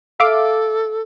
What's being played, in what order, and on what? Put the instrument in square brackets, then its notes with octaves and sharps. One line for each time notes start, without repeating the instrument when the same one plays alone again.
[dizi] A4 [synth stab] E5 F5 D6